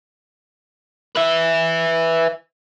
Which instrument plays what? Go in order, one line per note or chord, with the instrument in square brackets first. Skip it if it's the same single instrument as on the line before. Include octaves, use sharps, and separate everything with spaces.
[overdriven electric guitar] B4 E5